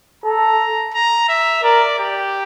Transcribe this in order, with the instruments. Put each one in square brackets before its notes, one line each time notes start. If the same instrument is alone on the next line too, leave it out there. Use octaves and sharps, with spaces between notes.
[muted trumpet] A4 [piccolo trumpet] A#5
[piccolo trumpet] A#5
E5
[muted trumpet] A#4 [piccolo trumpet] D5
[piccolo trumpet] G4